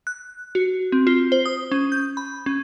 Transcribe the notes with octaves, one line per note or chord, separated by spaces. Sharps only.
F#6
F#4
C4
F4
C5
D#6
C#4
G6
B5
C#4